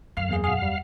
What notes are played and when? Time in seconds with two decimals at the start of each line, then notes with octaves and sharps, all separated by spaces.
0.17 F#2 A4 F5
0.29 E2 A#3 G#4
0.44 B2 G#4 F5 F#5
0.58 E2 G3